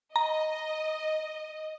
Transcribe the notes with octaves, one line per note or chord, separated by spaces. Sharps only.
D#5 A#5